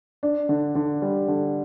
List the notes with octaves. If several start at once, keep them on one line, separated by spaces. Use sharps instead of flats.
D4
D3
D3
G3
D3